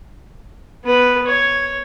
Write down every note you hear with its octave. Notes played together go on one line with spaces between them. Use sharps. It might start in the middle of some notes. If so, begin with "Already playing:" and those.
B3 B4
C#5